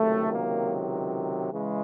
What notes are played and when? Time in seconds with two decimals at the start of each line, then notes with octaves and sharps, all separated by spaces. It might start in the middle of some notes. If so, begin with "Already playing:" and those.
Already playing: C#2 C3 D#3 F#3 A3
0.31 A#3
1.52 C#3 E3 G#3